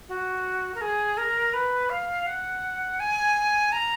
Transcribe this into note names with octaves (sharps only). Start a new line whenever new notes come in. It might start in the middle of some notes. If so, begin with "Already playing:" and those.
F#4
A#4
G#4
A#4
B4
F5
F#5
G#5
A#5